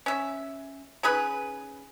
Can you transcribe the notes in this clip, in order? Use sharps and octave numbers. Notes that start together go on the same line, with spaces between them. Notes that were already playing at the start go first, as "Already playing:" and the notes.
C#4 E5
C#4 D#4 G#4 B4